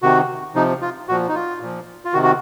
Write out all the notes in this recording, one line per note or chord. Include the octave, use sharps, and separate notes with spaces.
C3 D#3 F#4
C3 F3 D#4
F4
A#2 F3 F#4
D#4
F4
A#2 F3
F4
C3 D#3 F#4
F#4